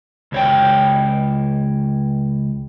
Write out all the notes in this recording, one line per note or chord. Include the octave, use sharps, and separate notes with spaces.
C#2 C#5 G5